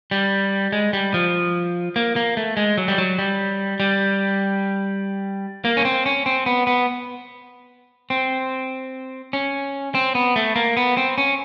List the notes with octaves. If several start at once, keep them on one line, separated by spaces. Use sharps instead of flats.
G3
G#3
G3
F3
A#3
A#3
A3
G#3
F#3
G3
F#3
G3
G3
A#3
C#4
C4
C#4
C4
B3
B3
C4
C#4
C4
B3
A3
A#3
B3
C4
C#4